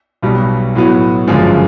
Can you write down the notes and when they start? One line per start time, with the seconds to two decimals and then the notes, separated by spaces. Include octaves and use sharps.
0.22 B1 B2 G3
0.75 A2 F#3 B3
1.27 G1 F#2 C#3 F3 G#3